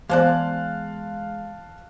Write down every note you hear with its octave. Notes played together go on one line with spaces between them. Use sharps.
E3 G#3 B3 C5 D5 F5 A5 F#6